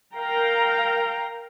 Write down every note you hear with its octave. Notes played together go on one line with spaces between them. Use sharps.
A#4 F5 G5 A#5